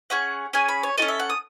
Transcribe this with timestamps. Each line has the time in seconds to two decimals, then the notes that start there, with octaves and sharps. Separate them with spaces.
0.10 C#4 G#4 F#5
0.53 C#4 G#4 G#5
0.68 B5
0.83 C#5
0.98 F#4 A4 D#5
1.02 C#4
1.08 E5
1.19 F#5
1.30 D#6